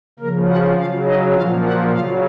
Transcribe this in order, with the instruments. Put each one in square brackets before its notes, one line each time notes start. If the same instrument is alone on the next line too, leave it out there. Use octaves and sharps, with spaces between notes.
[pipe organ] C#3 F3 A#3 A#4
F#4 F#5
C#3 F#3 F4 F5
D#4 D#5
A#2 F3 F4 F5
F#4 F#5
C#3 F#3 F4 F5